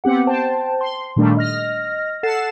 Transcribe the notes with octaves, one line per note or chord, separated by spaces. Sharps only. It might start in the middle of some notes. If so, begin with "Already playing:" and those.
B3 C4 G4 F#5
C5 G5 A5
C6
A#2 D#3 G3 A3 D4
D#5 F6 A#6
A4 F#5 A6 C7 E7